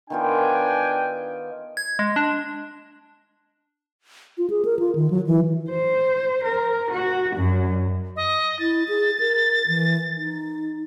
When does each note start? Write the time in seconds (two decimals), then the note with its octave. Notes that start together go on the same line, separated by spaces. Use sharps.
0.10 D#3 B3 D4 F4 G5 G#5
1.77 G#6
1.99 G#3
2.16 D4
4.38 F4
4.50 G#4
4.65 A#4
4.79 F4
4.95 D#3
5.11 F#3
5.27 E3
5.70 C5
6.44 A#4
6.91 F#4
7.36 F#2
8.16 D#5
8.59 E4 A6
8.88 G#4
9.20 A#4
9.68 E3
10.17 D#4